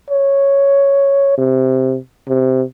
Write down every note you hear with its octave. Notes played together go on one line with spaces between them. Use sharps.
C#5
C3
C3